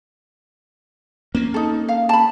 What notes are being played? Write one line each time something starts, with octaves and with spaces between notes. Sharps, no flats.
A#3 C4 C#4
D#4 A4
F5
A5 B5